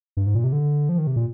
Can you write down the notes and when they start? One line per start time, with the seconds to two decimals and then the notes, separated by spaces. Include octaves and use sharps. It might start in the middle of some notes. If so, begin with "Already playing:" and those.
0.17 G2
0.27 G#2
0.35 A#2
0.44 C3
0.53 D3
0.89 F3
0.98 D#3
1.07 C3
1.16 A#2